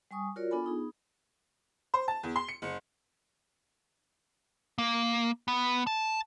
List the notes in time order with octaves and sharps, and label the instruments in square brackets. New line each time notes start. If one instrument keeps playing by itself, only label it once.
[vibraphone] G3 G#5 C#6 D#6
F4 F#4 A#4 C#5 D5
B3 D4 F4 A4 G#5 B5
B3 D#4 G#4
[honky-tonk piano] C5
A5
E2
C6
C#7
F#1
[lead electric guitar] A#3
B3
A5